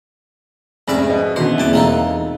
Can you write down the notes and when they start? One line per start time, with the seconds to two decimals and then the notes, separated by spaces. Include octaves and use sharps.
0.88 F1 G#2 C3 C#4 D5 E5 B5
1.10 B2 D#5
1.36 B2 D3 E3 B3 C#4 F#4 C5
1.58 E2 A#3 C4 E4 A5 D6
1.73 E1 C4 D#4 F4 G#4 A4 A#5